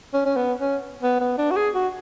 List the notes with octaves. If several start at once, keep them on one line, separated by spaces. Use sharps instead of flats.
C#4
C#4
B3
C#4
B3
B3
D4
F#4
G#4
F#4